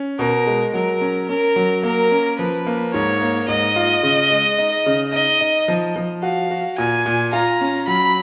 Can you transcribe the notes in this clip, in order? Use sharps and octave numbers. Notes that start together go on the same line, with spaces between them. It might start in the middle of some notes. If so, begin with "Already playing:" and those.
Already playing: C#4
B2 A#4
G#3
F#3 A#4
C#4
C#4 A#4
F#3
A#3 A#4
C#4
F3 B4
A#3
G#2 C#5
A#3
G#2 D#5
F4
C#3
G#3
D#4
C#3
D#4 D#5
D#4
F3
F3
F#4 F5
F#4
A#2 G#5
A#2
F4 A#5
C#4
F#3 B5